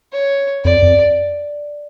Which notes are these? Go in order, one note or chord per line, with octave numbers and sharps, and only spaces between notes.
C#5
F2 D5
F2